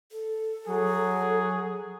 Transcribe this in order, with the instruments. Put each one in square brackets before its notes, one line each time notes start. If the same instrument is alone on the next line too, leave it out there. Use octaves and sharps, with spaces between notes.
[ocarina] A4
[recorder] F#3 [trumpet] G#4